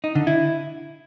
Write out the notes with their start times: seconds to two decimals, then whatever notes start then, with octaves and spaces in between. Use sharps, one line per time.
0.04 D#4
0.15 D3
0.27 E4